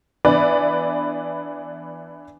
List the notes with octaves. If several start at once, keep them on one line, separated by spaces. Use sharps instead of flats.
E3 B3 D4 B4 D5